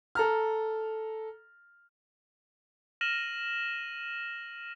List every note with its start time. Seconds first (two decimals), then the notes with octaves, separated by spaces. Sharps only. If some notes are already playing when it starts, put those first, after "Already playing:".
0.15 A4 A#5 F6
3.01 F6 A#6 D#7 E7 F#7